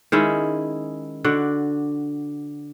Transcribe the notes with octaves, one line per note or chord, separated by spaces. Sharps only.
D#3 G#3 C#4 E4
D3 F#4 D5